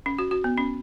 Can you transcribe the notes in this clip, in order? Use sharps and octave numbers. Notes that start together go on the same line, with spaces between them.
C#4
F#4
F#4
B3
C#4